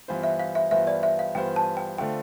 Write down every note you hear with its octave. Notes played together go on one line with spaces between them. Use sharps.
G2 E3 B3 F4 C5
E5
F5
E5
G2 E3 B3 F4 C5 E5
D5
E5
F5
G2 E3 B3 F4 C5 G5
A5
G5
D3 A3 C4 F4 G5